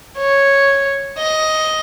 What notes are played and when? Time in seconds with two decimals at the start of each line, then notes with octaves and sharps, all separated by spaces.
0.18 C#5
1.18 D#5